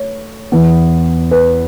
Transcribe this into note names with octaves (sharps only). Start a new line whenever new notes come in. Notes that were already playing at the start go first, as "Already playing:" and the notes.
Already playing: A3 C#5
E2 E3 B3
B4